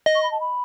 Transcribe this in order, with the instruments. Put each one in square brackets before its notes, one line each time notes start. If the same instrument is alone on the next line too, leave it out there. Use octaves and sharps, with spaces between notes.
[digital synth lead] D#5
[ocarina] C#6
B5
A5
B5